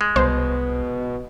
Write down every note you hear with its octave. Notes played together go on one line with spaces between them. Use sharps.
G#3
C2 B2 C5